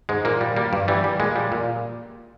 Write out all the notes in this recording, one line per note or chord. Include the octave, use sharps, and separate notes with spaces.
G#2 G#3
A#2 A#3
G3
G3 A#3
G2
E3 G3
G3
A#2 G#3
G3
A#2